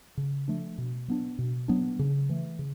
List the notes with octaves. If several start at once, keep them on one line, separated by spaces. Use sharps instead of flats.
C#3
F3 A3 D4
B2
F#3 B3 D4
B2
F#3 B3 D4
C#3
E3 A3
C#3